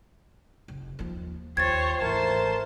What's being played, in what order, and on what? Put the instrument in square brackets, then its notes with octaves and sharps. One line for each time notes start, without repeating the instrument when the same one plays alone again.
[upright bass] F1
D#2 F3
[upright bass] D#2 [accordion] F4 G5 C6 [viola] C5 C#5 [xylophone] G#6 A6
[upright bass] G#1 E3 [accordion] A3 A#4 [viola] C5 A5